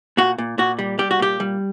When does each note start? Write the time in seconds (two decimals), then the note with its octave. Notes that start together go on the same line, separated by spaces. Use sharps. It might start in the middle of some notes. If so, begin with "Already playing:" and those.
0.17 A#2 F#4
0.38 A#2
0.58 A#2 F#4
0.79 G3
0.99 G3 G4
1.11 F#4
1.19 A#2 G4
1.40 G3